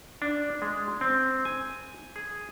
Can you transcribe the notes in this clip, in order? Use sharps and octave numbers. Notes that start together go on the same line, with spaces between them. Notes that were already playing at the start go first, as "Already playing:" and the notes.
D4
G#3
C4
G#5
G#4